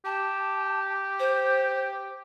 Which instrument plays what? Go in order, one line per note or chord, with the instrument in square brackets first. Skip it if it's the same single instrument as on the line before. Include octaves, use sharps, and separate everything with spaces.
[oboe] G4 [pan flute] A5
[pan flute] C5